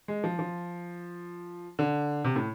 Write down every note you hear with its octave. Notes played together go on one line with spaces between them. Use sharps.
G#3
F3
F3
D3
C3
A2